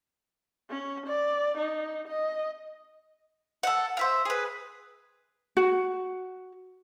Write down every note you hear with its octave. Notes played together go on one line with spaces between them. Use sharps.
C#4
D5
D#4
D#5
A4 F#5
C5 E5 F5
G#4 B4
F#4